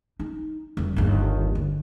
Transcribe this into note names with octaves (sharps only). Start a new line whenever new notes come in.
D#4
F1 G3
G1 D#2
D2